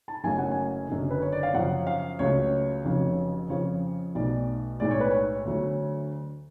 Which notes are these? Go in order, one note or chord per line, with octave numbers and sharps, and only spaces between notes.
A5
F#1 F#2 C#3 F#3 A3 G#5
F#5
G#5
F#1 F#2 D3
B4
C#5
D5
F5
F#2 C#3 F3 F#5
F5
C#2 C#3 F#3 A3 C#5
F1 F2 C#3 F#3
F2 C#3 F3 C#5
B1 B2 A3 D5
B1 A2 G#3 D5
C#5
B4
C#5
D2 D3 F#3 A3